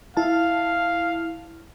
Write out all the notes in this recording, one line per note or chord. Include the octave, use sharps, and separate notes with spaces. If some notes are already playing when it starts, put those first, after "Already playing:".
E4 F5 A5